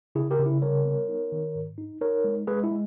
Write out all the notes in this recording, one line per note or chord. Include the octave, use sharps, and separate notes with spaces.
C#3 E4 G#4
G4 A#4
C#3
E4
G3 A#4 C#5
B3
D#4
D#3
G#2
D#4
D#4 A#4 C#5
G#3
G#3 G#4 B4
E4
G#3